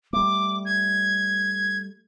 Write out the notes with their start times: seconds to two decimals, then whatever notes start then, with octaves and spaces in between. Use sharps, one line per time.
0.13 G3 A3 D6
0.65 G#6